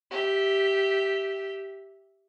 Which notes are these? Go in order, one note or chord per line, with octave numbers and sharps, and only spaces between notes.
G4 E5